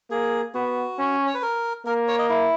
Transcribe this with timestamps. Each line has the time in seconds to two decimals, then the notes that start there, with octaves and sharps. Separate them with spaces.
0.11 A#3 G#4
0.55 B3 F#4
0.98 C#4
1.27 C#5
1.34 B4
1.42 A#4
1.86 A#3 A#4
2.08 C#5
2.19 D#5
2.29 E4